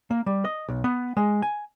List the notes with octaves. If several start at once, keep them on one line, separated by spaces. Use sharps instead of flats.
A#3
G3
D#5
B1
B3
G#3
G#5